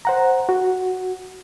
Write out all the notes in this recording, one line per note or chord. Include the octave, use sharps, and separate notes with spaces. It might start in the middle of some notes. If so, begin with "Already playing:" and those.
C5 F#5 A#5
F#4